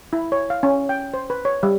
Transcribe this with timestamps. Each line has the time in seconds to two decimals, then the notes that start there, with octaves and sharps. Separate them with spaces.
0.13 E4
0.32 C#5
0.50 F5
0.63 C#4
0.89 G5
1.14 C5
1.30 B4
1.45 C#5
1.63 G3